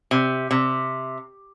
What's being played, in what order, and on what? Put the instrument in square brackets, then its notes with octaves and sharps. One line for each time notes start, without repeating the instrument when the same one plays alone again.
[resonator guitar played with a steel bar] C3
C3